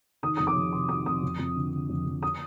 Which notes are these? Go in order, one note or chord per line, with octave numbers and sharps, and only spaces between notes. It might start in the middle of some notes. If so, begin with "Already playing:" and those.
D#3 D#6
F2 D#6
D6
F2
C3 C6
D#3 D#6
F2 D#6
F2
F2
D3
D3
F2
F2
D#6